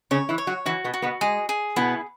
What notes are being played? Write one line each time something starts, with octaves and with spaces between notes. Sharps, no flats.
C#3 C#4 C#5
E3 E4
C#5
F#3 F#4
E3 E4 F#4
B2 B3
F#4
B2 B3
G#3 G#4
G#4
B2 B3 E4